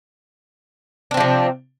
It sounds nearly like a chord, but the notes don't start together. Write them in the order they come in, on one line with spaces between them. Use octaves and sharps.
D4 C4 F3 C3